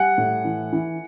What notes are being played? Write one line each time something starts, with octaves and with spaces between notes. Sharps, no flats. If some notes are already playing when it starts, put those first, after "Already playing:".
Already playing: G3 F#5 G#5
A2
E3
E3